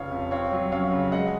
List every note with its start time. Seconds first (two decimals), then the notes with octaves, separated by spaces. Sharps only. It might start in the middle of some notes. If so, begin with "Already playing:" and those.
Already playing: F1 C#3 F3 C#5 F5
0.12 F2
0.31 C4 C#5 F5
0.52 F#3
0.72 F#2 C#5 F5
0.92 C#3
1.12 G#3 D#5 F#5